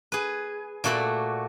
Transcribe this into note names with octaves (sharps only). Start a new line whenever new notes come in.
G#4 B4
A#2 A3 F#4 D5 B5